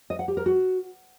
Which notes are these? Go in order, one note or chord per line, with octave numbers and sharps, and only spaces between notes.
D#5
F#5
G4
A#4
F#4